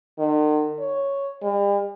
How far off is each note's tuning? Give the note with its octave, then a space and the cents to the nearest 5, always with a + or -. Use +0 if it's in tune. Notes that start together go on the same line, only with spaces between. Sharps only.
D#3 -45
C#5 +0
G3 +45